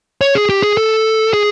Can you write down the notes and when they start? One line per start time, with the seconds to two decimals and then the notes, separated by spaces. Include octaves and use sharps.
0.21 C#5
0.35 G#4
0.49 G4
0.63 G#4
0.77 A4
1.33 G#4